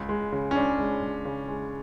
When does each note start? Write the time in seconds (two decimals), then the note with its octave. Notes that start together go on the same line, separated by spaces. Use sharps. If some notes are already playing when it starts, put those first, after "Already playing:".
Already playing: C#2
0.09 G#3
0.32 C#3
0.51 C#4
0.55 C#2 D4
0.79 G#3
1.02 C#2
1.25 C#3
1.48 G#3